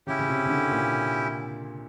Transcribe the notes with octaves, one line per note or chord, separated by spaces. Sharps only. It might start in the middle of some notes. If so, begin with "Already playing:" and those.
C#3 C#4 E4 G4
C#3
C3
C#3
D3
A#2